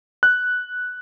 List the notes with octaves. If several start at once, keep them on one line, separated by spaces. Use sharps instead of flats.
F#6